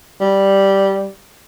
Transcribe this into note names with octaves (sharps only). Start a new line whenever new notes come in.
G3